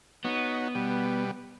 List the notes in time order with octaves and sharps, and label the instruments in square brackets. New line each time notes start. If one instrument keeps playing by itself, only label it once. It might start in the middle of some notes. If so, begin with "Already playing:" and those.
[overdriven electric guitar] B3 [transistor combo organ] D#4 F#4 C#5
[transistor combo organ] B2 G3